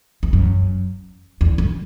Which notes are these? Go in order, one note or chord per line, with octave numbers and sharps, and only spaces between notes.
E2
F#2
E2
F#2